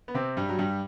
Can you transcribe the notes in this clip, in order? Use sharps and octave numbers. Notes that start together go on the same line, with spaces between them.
B3
C3 C4
G2 G3
F#3
G2 G3